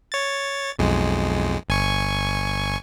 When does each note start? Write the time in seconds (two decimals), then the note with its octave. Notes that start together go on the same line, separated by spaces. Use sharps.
0.12 C#5 A6
0.79 B1 F2 G#3
1.69 G1 G#5 C#6